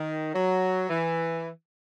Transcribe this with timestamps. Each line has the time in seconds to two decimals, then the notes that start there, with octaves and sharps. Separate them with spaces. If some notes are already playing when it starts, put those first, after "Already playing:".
Already playing: D#3
0.33 F#3
0.89 E3